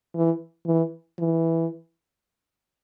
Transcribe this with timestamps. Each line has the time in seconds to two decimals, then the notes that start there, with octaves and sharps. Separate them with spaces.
0.15 E3
0.66 E3
1.19 E3